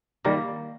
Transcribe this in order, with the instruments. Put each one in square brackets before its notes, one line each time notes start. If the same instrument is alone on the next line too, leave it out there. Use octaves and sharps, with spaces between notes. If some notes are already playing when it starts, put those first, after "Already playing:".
[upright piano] D#3 G3 [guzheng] A#3